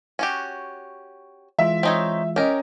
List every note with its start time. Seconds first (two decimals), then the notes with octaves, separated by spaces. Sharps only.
0.19 C#4 F#4 G4
1.59 E3 G#3 F4 E5
1.83 C4 D#4 C#5
2.36 C#4 G4 A#4 D#5